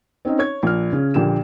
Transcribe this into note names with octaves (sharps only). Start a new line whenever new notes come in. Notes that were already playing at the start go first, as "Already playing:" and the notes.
C4 C#4 D#4 D#5
C#5 G#6
A#1 F6
C#3 C#4
A#1 A#2 D3 G4 E7